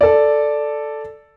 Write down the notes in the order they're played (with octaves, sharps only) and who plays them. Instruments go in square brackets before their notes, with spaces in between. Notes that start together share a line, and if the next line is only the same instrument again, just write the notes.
[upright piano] A4 D5